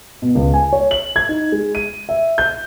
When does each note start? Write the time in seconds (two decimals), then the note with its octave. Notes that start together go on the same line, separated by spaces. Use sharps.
0.22 B2
0.35 C#2
0.54 G#5
0.73 C#5
0.91 F#7
1.16 G#6
1.29 D#4
1.52 G#3
1.75 D#7
2.09 E5
2.38 G6